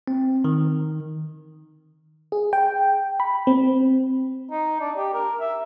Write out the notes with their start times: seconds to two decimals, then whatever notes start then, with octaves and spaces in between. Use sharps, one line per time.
0.08 C4
0.44 D#3
2.32 G#4
2.53 G5
3.20 B5
3.47 C4
4.51 D#4
4.81 D4
4.97 G4
5.14 A#4
5.40 E5